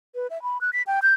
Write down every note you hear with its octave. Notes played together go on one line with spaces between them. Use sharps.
B4
E5
B5
F#6
B6
G5
G6